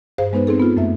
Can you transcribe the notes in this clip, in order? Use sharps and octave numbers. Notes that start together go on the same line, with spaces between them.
G2 G#4 C5 F5
G#3 B3 D#4 B4 C5
C4 D#4 G#4 A4
B3 F4
F#2 A3 A#3 E5